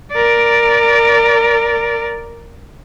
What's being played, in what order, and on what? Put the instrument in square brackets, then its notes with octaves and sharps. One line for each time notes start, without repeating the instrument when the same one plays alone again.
[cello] A#4 D5